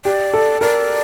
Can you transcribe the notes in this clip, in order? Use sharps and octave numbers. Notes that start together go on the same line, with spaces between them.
G4 D5
A4
A#4 D5